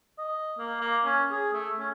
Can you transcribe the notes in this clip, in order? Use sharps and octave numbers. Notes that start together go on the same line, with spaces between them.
D#5
A#3
A#3
C#4
G#4
A3
C#4